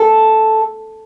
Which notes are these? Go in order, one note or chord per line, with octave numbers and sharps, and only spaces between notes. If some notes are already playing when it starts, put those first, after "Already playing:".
Already playing: A4